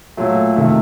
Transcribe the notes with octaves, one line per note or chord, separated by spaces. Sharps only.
A#2 F#3 A3
C3 D#3 A3